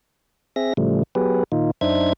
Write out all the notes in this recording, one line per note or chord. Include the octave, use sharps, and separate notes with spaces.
C4 G#4 E5 A#6
A2 C#3 F3 G3 A3
F#3 B3 G4 G#4 B4
A#2 D#3 D#4 F4
F#2 D4 D#4 C5 E5 G#6